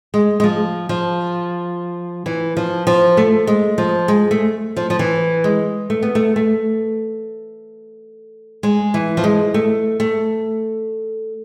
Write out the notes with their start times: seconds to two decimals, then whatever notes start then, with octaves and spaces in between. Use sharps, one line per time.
0.14 G#3
0.40 G#3
0.43 F3
0.89 F3
2.26 E3
2.57 F3
2.87 F3
3.17 A3
3.47 G#3
3.78 F3
4.08 G#3
4.31 A3
4.77 F3
4.90 F3
4.99 E3
5.44 G#3
5.90 A3
6.03 B3
6.15 A3
6.36 A3
8.63 G#3
8.94 E3
9.17 F3
9.24 G#3
9.54 A3
10.00 A3